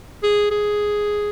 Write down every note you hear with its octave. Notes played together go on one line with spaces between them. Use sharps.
G#4
G#4